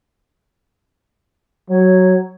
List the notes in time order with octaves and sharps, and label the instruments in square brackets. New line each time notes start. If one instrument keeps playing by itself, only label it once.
[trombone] F#3 [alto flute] C#5